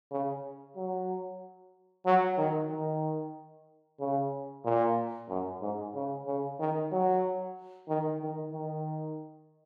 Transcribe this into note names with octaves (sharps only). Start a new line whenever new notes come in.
C#3
F#3
F#3
D#3
D#3
C#3
A#2
F#2
G#2
C#3
C#3
D#3
F#3
D#3
D#3
D#3